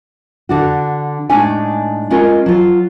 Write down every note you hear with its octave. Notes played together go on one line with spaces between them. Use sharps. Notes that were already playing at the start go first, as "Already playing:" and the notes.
D3 D4 F#4
A2 G#3 D4 D#4 C#5 G#5
G#3 C#4 F4 A#4 D#5
F#3 F4